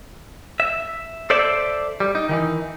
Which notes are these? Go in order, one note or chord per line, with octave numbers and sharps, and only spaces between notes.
E5
A4 C5 D5 E5
G3
D#4
D#3 E3 D#4